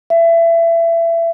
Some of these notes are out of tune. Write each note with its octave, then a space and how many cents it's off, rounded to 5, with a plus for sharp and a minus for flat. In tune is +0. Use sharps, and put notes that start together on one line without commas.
E5 +25